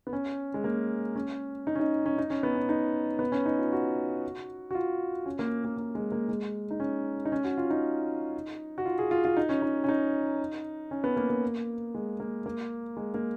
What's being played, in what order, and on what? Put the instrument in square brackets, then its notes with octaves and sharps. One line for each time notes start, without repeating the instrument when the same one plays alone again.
[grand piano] B3
C#4
G#3
A#3
C#4
D#4
C#4
D#4
C#4
D#4
C#4
B3
C#4
D#4
B3
C#4
D#4
F4
F#4
F#4
F4
C#4
A#3
A#3
A#3
G#3
A#3
G#3
D#4
C#4
D#4
C#4
F#4
F4
D#4
F#4
F4
G#4
F4
F4
D#4
C#4
D#4
C#4
D#4
C#4
B3
A#3
A#3
G#3
A#3
A#3
G#3
A#3